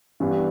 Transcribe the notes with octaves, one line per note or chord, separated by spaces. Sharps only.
G2 E3 B3 D4 G4